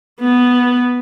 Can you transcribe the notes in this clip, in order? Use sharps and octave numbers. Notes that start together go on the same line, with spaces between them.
B3